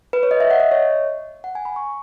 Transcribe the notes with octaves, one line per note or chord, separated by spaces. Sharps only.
B4
C#5
D#5
E5
F#5
D#5
C#5
F#5
G#5
B5
C#6